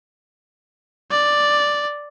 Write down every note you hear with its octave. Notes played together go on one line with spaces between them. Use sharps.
D5